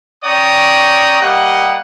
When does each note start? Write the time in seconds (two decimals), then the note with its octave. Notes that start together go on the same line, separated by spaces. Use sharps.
0.24 C#4 C#5 D5 G5 A#5 D#6
1.21 G3 A#3 G4 D#5 F#5